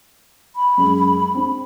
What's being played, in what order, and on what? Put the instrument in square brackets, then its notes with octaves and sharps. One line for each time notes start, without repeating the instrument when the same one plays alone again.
[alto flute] B5
[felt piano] F#2 G#3
C4 D4